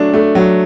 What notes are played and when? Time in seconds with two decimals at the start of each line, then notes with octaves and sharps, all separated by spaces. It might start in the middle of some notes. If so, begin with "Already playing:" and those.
Already playing: F#3 A3 D4
0.13 A3
0.35 F#3